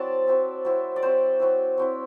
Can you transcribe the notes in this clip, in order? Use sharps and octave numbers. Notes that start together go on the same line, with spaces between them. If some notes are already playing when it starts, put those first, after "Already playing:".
Already playing: F#3 C4 E4 D5 A5
F#3 C4 E4
F#3 C4 E4
D5
F#3 C4 E4 C5
F#3 C4 E4
F#3 C4 E4